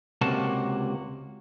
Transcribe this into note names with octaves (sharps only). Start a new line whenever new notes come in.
C#2 C3 A#3 F#4 A5